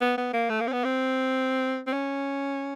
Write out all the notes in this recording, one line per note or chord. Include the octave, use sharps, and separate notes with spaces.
B3
B3
A#3
A3
A#3
C4
B3
C4
C4
C#4